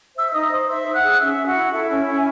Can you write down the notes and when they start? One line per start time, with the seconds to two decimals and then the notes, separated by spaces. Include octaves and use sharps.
0.16 C5 E5 E6
0.26 E6
0.33 D#4 D#5 D#6
0.51 C5
0.68 C5 E5 E6
0.86 D#4
0.94 F#5 F#6
1.03 G#4
1.20 C#4 E5 E6
1.37 C#4
1.46 F#4 F#5
1.54 E4
1.71 E4 A4 E5
1.89 C#4
2.06 C#4
2.15 G#5